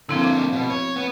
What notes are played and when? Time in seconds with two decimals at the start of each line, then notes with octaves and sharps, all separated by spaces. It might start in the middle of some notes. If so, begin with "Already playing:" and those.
0.09 D3 F3 A#3 C4 E4
0.24 D6
0.53 B2
0.70 C#5
0.96 B3